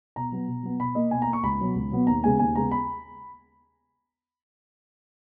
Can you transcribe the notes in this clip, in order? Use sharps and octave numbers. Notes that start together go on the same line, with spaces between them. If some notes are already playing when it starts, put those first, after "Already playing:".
B2 A#5
F#3 B3
B2
F#3 B3
B2 B5
A#3 D#5
B2 G#5
A#5
A#3
C#6
C#2 B5
B2 F#3 B3
C#2
B2 F#3 B3
D#2 A#5
C#3 G#3 B3 G#5
D#2 G#5
C#3 G#3 B3 A#5
B5